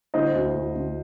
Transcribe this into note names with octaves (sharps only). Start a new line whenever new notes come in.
D3 C5 D#5
D2
D2
D2